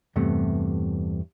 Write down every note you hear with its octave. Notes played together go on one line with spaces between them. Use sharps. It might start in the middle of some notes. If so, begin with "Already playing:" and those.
E2 G2 C3 A3